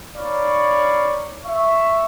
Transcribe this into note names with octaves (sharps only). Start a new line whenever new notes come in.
D#4 C#5 D5 F5 B5 C#6
E5 C#6